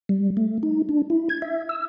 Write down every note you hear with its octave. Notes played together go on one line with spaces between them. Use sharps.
G3
A3
D#4
D4
E4
G#6
E5
E6